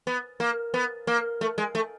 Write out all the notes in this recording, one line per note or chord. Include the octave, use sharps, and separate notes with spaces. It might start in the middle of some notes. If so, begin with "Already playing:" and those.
B3
A#3
B3
A#3
A3
G#3
A3